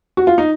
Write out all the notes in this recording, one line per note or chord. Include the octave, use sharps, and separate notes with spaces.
F#4
F4
D#4